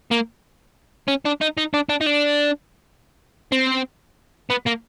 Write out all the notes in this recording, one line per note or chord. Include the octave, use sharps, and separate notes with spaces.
A#3
C#4
D4
D#4
D#4
D4
D4
D#4
D4
C4
B3
A#3